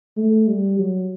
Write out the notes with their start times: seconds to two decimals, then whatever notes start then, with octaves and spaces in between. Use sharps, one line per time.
0.17 A3
0.47 G3
0.78 F#3